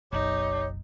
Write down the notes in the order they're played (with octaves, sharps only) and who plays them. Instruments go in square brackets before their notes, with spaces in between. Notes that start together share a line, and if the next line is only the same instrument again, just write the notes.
[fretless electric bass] F#1 B1 F#2 [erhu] D#4 [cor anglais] G4 [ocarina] C#5